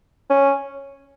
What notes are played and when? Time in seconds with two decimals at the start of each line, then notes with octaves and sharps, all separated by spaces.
0.30 C#4